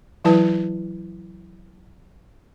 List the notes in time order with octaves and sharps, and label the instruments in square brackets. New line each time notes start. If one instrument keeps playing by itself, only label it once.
[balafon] E3 F#3 E4 B4 A5